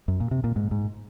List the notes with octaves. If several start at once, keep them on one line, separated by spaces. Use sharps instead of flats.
F#2
A#2
C3
A#2
G#2
G#2